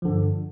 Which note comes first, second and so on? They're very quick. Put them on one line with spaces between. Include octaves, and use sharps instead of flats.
F3 D3 G2